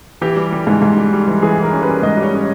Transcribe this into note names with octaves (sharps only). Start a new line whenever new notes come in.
E3 G4
G3
G3
G#2
G#2
G3
G3
E3
E3 G#4
E3 A#4
C#4
B4
G3
G#2 D#5
G3
C#5
C#4